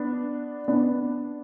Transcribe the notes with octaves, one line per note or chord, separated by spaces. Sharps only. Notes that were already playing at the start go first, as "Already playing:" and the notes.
Already playing: B3 D4
B3 D4